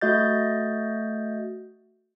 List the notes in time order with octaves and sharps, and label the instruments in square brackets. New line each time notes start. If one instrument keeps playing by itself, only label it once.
[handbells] A3 F#4 D#5 G6 A6